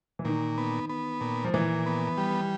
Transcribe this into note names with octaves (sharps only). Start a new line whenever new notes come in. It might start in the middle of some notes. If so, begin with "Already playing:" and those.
E3
A#2 D#3
B3
B3
A#2
F3
A#2 E3
B3
G3